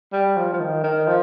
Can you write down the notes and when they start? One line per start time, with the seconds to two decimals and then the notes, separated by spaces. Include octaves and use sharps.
0.13 G3
0.37 F3
0.53 F3
0.60 D#3
0.83 D#3
1.08 F3